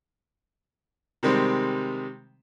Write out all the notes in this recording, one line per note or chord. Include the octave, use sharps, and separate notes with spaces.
C3 D#3 G3 G#3 C4